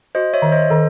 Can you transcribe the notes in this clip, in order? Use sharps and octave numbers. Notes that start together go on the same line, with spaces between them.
F#4 C5 D#5
C#5 E5
D#3
C5 D#5
D#3 A4